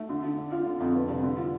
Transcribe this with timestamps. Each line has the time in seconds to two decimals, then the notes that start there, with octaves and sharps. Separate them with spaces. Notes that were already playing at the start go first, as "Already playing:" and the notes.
Already playing: A3
0.09 D3
0.23 D3
0.37 D4
0.52 F4
0.66 D3
0.80 F2
0.95 B3
1.09 C2
1.23 D3
1.38 F4